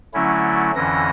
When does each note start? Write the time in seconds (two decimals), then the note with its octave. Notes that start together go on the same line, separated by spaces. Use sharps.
0.14 D3 F#3 A3 C#4 E4
0.75 F2 D3 E3 C#4 A#6